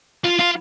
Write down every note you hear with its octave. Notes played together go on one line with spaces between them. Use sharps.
F4
F4